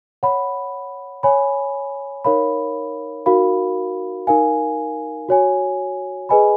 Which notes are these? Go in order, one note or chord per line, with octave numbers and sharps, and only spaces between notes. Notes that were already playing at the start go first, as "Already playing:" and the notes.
C#5 F#5 B5
C#5 G#5 B5
D#4 A#4 C#5 F5 B5
D#4 F#4 A#4 F5 B5
D#4 A#4 F5 G#5
F#4 C#5 G#5
G#4 B4 D#5 G#5 B5